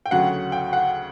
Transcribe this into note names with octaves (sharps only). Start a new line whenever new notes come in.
G5
D2 C#3 F#3 F#5
G5
F#5